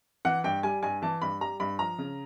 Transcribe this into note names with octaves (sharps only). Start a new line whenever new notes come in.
E3 F#5
G2 G5
G3 G#5
G2 G#5
E3 A5
G2 B5
G3 A#5
G2 B5
F3 A#5
C#3